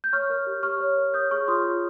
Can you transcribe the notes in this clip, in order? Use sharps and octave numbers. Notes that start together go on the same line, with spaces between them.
G6
C#5 C#6 F6
A#4
G4
G4 C#6 F6
C#5
A#4
C#5 D#6 G6
G#4 C#6 F6
F4 C6 D#6
F4